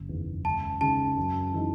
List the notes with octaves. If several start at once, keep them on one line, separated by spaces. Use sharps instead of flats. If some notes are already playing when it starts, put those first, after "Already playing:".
Already playing: F#1
E2 D#3
C#2 A5
C#3 G#3 D#4 A5
F#2
E3 G#3 D#4